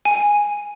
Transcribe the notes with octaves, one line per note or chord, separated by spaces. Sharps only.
G#5